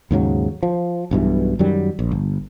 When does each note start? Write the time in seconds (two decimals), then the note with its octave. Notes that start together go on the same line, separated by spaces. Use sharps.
0.11 D#2 G#2 C#3 F#3
0.63 F3
1.11 B1 G2 B2 E3
1.59 F#2 D#3 F#3 G3
1.99 A#1
2.12 G1